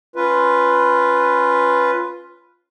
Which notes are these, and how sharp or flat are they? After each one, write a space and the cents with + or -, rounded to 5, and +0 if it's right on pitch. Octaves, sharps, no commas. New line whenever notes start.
C#4 -5 F4 +0 B4 +0